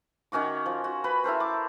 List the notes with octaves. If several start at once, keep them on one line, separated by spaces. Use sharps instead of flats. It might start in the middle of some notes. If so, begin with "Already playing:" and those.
D#3 C#4 F#4 D6
F3
F#4
B4 B5
E4 A4 A#4 C5
D6